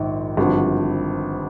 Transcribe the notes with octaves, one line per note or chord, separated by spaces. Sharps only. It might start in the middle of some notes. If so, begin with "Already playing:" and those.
Already playing: A#1 G#2 D#3
G#1 G2 D3 F3